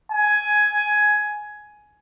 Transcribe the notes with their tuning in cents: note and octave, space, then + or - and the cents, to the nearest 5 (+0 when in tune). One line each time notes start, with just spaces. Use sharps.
G#5 +10